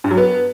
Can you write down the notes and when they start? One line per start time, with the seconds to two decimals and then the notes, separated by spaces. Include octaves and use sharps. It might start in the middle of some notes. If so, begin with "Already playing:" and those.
0.04 G2
0.11 F#3
0.17 B3